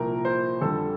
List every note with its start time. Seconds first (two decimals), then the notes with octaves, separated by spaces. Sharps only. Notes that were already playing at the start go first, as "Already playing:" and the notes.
Already playing: C2 A#2 F3 A#4
0.25 C5
0.61 F2 D3 G3 A4